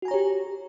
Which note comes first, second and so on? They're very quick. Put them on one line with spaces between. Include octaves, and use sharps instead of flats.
F#4 G#5 A#5 C#5 G4